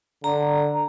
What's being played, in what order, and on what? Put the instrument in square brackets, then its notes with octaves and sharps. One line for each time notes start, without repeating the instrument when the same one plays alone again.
[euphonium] D3 [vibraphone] A#5